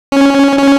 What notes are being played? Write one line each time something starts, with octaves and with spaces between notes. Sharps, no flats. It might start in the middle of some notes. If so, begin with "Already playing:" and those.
C#4
C#4